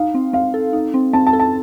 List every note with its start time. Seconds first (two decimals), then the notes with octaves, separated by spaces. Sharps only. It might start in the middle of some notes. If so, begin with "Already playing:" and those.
Already playing: D#4 F5
0.15 C4
0.33 C4 F5
0.54 A4
0.73 D#4
0.94 C4
1.13 C4 A5
1.26 A5
1.33 A4
1.39 A5